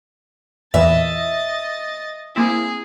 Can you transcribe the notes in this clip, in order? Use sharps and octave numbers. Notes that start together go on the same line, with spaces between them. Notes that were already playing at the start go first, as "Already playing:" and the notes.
E2 A#2 E3 D#5 E5 A6
A#3 C4 E4 G#4